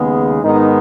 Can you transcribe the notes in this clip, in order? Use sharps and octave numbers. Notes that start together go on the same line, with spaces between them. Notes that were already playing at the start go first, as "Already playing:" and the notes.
Already playing: D#2 C#3 G#3 B3
G#2 D#3 G#3 B3 D#4